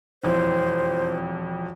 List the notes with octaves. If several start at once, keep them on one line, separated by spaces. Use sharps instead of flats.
E1 F2 E4 C5